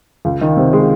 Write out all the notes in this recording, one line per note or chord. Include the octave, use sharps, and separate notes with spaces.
C#2
D#3
C3
G#3